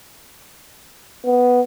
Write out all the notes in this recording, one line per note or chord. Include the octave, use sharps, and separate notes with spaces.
B3